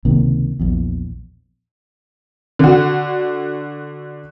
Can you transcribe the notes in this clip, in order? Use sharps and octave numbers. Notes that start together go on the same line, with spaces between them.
C#2 C3 D#3 A#3
A#1 E2
D3 F#4